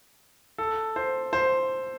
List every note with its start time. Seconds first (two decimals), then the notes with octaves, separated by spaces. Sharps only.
0.58 A4
0.96 C5
1.33 C5